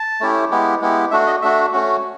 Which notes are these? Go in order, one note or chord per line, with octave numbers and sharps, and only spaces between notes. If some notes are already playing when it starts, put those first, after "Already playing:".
Already playing: A5
A3 C#4 E4 G4
G#3 B3 E4 G4
G#3 B3 E4 G4
A3 D4 F#4 E5
D#5
A3 D4 F#4 E5
A3 C#4 F#4